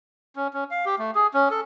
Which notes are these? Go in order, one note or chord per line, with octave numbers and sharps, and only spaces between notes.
C#4
C#4
F5
G4
A3
G#4
C#4
A4